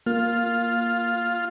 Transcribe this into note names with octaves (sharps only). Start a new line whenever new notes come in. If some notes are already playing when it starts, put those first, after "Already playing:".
A#3 F4